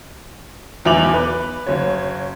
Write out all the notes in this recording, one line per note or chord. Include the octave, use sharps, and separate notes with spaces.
B1 E2 E4 D6 F7 F#7
B4
F#1 C#5